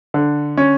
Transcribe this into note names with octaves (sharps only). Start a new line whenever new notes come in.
D3
C#4